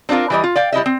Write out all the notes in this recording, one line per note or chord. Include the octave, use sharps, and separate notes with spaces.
C4 D4 E4 F4 A#4
E3 G3 D#5
F4
D5 F5 G5
G3 E4 D#5 E5
C4